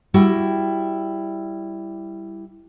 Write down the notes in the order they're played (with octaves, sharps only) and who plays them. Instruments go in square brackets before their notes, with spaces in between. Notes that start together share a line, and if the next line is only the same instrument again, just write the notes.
[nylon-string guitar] G3 E4 F#4 G5